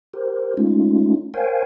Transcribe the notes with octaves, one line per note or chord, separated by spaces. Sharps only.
G4 A#4 C5
G#3 A3 C#4 D#4 F4
A#4 C5 C#5 F5 G5 G#5